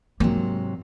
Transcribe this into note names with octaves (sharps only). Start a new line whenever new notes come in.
G#2 C3 F#3 A#3